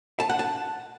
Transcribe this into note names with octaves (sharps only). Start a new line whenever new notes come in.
A5
F#5
A5